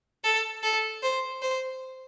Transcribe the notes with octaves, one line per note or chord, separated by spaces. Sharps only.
A4
A4
C5
C5